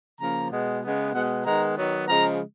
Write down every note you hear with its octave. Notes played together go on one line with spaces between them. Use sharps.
C#3 F3 A#3 A#5
B2 G#3 B3
C#3 G#3 B3
B2 G#3 B3 F#5
D#3 G#3 B3 A#5
D#3 F#3 B3
C#3 F3 G#3 A#5